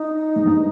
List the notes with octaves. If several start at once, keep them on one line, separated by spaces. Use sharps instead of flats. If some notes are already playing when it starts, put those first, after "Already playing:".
Already playing: D#4
G#2
G2